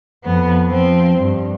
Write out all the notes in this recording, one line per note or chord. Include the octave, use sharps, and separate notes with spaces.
F2 B3
F3 C4
G2